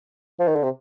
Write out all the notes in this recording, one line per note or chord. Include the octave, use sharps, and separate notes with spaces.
F3
D#3
D3
C3